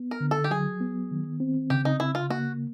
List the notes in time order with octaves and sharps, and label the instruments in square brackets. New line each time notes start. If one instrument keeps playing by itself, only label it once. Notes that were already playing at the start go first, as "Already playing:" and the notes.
Already playing: [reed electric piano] B3
[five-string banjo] A#4
[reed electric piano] D3
[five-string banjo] A4
G4
[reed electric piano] F#3 [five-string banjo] G#4
[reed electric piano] B3
D#3
C4
[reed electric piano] C#3 [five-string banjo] G4
[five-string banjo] D#4
[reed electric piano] C#3 [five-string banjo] E4
[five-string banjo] F4
[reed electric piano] A#3 [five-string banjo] F#4